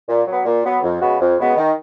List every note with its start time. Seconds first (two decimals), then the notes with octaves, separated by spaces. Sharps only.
0.07 A#2
0.25 F#3
0.30 B3
0.44 A#2
0.62 F#3 B3
0.82 F2
1.00 C#3 G#3 B3 F#4
1.20 F2
1.38 C#3 G#3 B3 F#4
1.56 D#3